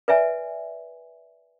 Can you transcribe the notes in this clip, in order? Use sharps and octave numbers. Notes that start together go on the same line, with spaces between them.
B4 D5 E5 G#5